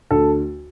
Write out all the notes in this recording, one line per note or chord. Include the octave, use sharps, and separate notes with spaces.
D2 A4